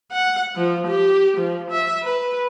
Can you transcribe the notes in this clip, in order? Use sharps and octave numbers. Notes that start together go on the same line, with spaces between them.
F#5
F3
G4
F3
E5
B4